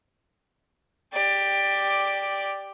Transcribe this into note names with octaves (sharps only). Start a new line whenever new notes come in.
G4 D5